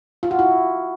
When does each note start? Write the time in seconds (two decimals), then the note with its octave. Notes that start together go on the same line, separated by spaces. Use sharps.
0.23 F4
0.31 F#4
0.39 E4